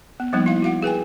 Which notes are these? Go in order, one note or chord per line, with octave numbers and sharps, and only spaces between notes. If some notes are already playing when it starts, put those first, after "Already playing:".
B3
F3 G3 A#3 B3 D#4
E4 F5
F#4 F5 F#5
G#4 B4 G5 G#5